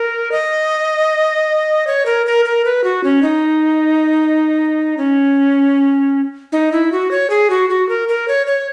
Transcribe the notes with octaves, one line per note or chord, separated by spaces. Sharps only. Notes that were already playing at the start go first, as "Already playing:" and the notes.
Already playing: A#4
D#5
C#5
A#4
A#4
A#4
B4
F#4
C#4
D#4
C#4
D#4
E4
F#4
C#5
G#4
F#4
F#4
A#4
A#4
C#5
C#5